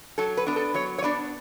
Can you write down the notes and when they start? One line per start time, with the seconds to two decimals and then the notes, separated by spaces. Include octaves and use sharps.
0.18 F#3 A4
0.37 B4
0.46 B3 D4
0.56 A4
0.74 F#3 C#5
0.98 C#5
1.03 B3 D4 D5